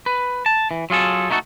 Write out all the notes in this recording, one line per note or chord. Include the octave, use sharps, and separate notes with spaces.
B4
A5
E3
F#3 F4 G#4 A4
A3 D#4 E4 F#4 A4